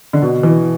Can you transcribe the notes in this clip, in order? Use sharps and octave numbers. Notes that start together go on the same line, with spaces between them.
D3
B2
E3